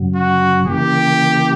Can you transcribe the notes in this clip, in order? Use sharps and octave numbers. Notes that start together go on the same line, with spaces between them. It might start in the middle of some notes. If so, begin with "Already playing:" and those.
Already playing: F#2 C#3 F#3
F#4
C#3 E3 A#3 G4